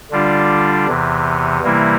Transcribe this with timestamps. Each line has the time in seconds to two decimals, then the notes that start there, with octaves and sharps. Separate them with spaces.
0.11 D3 G3 D4 F4
0.87 E2 C3 E3
1.63 C3 E3 G3 A#3 E4